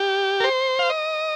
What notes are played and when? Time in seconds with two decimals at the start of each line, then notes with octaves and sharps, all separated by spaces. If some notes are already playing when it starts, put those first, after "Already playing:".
Already playing: G4
0.40 A#4
0.44 C5
0.79 F5
0.90 D#5